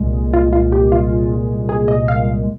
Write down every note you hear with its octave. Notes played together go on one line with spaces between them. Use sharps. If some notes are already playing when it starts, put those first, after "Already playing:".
Already playing: C2 A#2 G#3
F4
F4
G4
F4
G#4
D#5
F5